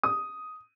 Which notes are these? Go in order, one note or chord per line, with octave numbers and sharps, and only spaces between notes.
D#6